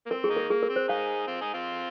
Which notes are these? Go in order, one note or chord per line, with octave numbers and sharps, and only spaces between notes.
A#3
C4 A#4
G#4
A#3 D#4
A#4
A#3 G#4
A#4
C4
C5
D#4 G#4 F5
C4 F4
D#4 G#4
C4 F4